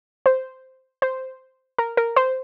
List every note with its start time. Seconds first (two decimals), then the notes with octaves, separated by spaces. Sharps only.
0.26 C5
1.02 C5
1.78 A#4
1.97 A#4
2.16 C5